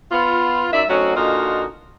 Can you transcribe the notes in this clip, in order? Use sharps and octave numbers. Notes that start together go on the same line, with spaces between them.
B3 F4
F#2 D#4 D5 E5
F#3 A3 C4 C#4 D#4 F#4
A#2 D3 D#4 F4 F#4 D#5